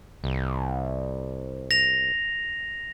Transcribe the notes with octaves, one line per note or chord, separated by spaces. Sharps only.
C2
A#6 F7